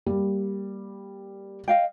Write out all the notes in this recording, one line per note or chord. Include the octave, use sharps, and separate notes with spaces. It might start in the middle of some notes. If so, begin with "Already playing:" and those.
G3 A#3
D#5 F5 G5